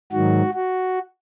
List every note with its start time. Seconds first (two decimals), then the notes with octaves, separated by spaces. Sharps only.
0.12 G#2 D#3 F#3 F#4
0.54 F#4